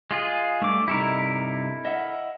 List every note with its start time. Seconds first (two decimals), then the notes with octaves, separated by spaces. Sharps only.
0.11 G#3 F4 G#4
0.62 G2 A3 D6
0.88 G2 C3 D#4 E4 A4 A#4
1.85 D#5 E5 F#5